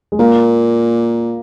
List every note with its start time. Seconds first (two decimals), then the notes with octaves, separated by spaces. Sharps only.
0.12 G#3
0.19 A#2 A#3